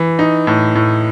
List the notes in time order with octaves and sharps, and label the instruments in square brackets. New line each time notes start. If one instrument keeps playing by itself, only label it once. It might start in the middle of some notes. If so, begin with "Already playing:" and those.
Already playing: [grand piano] E3
D#4
A2
A2